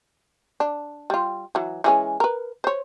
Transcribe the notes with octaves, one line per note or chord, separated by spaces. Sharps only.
D4
G3 F4
E3 F#3
E3 G#3 C#4
A#4 B4
C5 C#5